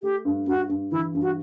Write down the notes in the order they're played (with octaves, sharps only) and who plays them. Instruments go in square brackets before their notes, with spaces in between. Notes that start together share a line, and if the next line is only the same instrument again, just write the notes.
[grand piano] A3 [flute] G4
[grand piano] G2
[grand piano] G2 [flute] F#4
[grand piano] G2
[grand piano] E3 [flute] E4
[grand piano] G2
[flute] F#4